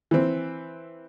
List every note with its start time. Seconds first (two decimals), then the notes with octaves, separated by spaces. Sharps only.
0.11 E3 C4